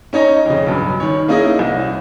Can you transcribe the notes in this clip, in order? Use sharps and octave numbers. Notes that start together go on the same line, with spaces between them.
C#4 D#4 C#5 D#5 A#5
F2 C#3
B1 G2
D#3 C#5
A#3 C#4 D#4 E4 G#4 D#5
C2